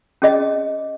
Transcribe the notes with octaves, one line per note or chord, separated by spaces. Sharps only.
C#4 G#4 D#5